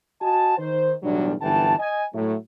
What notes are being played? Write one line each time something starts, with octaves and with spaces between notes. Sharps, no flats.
F#4 D#5 F#5 G#5 A5
D#3 C5
B1 E2 A2 F#3 G3 D4
G1 F#2 E3 G5 A5
D#5 G#5
A2 F#3 A3